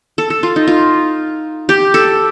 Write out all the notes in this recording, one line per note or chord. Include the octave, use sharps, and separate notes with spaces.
A4
A4
F4
D#4
F4
G4
A4